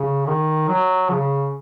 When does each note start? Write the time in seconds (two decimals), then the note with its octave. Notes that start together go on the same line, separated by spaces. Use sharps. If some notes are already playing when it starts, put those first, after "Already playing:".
Already playing: C#3
0.26 D#3
0.68 F#3
1.11 C#3